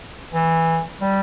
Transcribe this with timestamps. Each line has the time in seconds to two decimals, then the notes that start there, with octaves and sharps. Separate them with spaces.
0.32 E3
1.01 G3